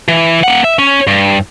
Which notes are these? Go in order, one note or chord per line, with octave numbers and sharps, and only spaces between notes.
E3
A#3 F#5
E5
C#4
G2